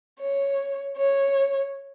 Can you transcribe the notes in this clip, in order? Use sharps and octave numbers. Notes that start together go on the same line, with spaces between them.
C#5
C#5